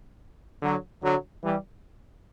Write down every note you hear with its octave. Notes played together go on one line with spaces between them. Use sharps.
D3 F#3
D3 F#3
E3 G3